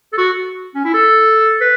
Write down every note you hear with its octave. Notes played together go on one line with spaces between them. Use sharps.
A4
F#4
C#4
E4
A4
B4